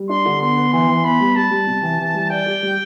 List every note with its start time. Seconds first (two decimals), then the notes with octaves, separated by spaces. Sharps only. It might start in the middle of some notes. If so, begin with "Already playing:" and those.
Already playing: G3
0.09 D4 C6
0.25 D3
0.41 B3 C6
0.57 B3
0.73 E3 C6
0.89 E3
1.04 B3 B5
1.21 G3
1.36 G3 A5
1.51 G3
1.67 C3
1.83 E3
2.00 E3
2.14 G3
2.30 D5 G5
2.46 G4
2.63 G3